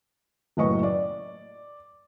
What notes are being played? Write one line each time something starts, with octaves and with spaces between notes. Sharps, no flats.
F#1 A2 B4 D#5 C#6
D5